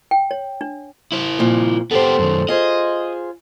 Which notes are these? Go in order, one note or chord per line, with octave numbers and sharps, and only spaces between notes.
G5
C#5
D4
E4 C5
F2 A#2
B3 G4 A4 C5
F#2 D#3
F4 G#4 C5 D#5